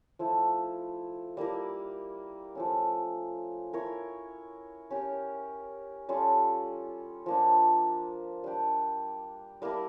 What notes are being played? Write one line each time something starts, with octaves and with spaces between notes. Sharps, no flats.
F3 A3 E4
G3 A#3 E4 A#4
F3 A3 C#4
E4 A#4 C#5
C#4 G4 A#4
G3 C#4 F4 A4
F3 A#3 D4
G3 D4 G4
G3 A#3 E4 A#4